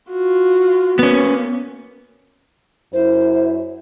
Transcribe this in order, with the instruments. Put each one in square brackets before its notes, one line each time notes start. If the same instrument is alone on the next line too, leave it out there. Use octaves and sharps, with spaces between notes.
[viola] F4 F#4
[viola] A#3 [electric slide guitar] B3 C#4
[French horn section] F#2 E4 [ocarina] C5